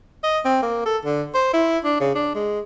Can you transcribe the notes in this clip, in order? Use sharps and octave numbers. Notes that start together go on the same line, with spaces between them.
D#5
C4
A#3
A4
D3
C5
E4
D4
C#3
D4
G#3